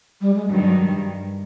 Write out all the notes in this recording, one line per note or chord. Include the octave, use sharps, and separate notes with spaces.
G3
G#3
G2 D#3 F#3
F#3